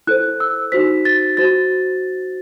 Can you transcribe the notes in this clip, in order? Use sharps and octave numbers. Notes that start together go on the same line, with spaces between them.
E4 A4 C5 F#6
E6
D#4 F#4 C5 B6
A6
F#4 C5 A6